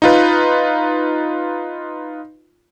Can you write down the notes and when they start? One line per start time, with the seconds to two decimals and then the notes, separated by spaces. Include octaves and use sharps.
0.02 D#4 F4 B4